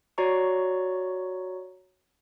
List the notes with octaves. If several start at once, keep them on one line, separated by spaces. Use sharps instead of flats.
F#4 C#5 D5 A#5 C#6